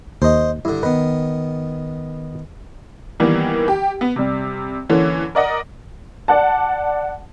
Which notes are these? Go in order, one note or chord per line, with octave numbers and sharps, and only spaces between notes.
D#2 C5 D#5
G2 D3 E4
D#3 B3 B4
D#3 E3 G3 A#3 B3
G4
B3
C3 G3
D3 E3 A#3 C#4
A#4 D5 D#5 F#5
D5 F#5 A5